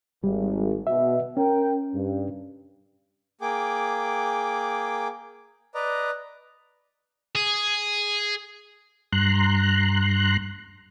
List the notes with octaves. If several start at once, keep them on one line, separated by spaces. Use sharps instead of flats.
G#1 G3
B2 E5
C#4 A#4 G5
G2
A#3 G#4 G5 D6
B4 D5 D#5 A#5
G#4
G2 A#5 C6 F#6